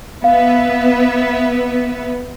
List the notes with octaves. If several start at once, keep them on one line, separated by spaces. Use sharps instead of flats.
B3 B4 E5 F5